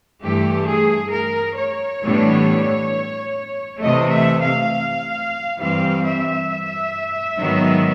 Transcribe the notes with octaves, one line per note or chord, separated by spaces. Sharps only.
G2 E3 A3 G4
G#4
A#4
C#5
A2 E3 G3 B3 D4
C3 E3 A3 D#5
E5
F5
G2 E3 G3 C4 F5
E5
G#2 D#3 F#3 B3